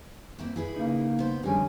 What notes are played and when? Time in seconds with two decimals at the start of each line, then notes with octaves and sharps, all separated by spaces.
0.38 A#3 C4 E4
0.56 E4 G#4 B4
0.76 C#3 A#3 D#4
1.19 B3 C5
1.43 F2 D3 G3 G#3 C#4